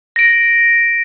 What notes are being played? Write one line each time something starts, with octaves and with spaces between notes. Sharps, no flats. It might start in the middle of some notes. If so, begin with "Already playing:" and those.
A#6 D7